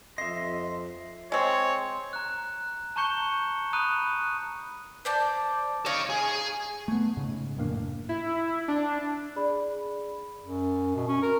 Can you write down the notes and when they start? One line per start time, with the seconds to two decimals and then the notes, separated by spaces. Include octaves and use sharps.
0.18 F2 D#5 E5 C6 C7
1.32 G#3 C4 C#5
2.13 A#5 F#6
2.96 A5 A#5 C#6 G6 C#7 G7
3.73 A#5 B5 D#6 F#6 D#7
5.05 C5 D5 A5
5.86 D#4 C#5 F5
6.09 G#4
6.88 A3 B3
7.17 G#2 C#3
7.57 F1 A2 A#3 D4
8.09 E4
8.68 D4
9.36 G#4 D5 B5
10.44 F#2
10.96 B2
11.08 C#4
11.22 A#4